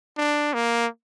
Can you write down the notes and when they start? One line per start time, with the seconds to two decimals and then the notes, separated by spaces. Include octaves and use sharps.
0.17 D4
0.54 A#3